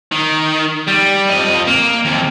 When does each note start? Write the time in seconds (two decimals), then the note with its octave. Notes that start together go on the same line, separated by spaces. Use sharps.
0.12 D#3
0.88 G3
1.30 F2 D#5
1.68 A#3
2.06 D#2 C3